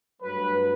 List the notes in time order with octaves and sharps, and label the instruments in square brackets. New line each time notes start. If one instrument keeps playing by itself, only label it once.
[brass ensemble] G2 F#3 A3 B4